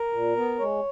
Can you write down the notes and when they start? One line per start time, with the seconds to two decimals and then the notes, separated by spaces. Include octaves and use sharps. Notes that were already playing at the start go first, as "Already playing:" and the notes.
Already playing: A#4
0.13 A#2
0.36 B3
0.59 G#3 C#5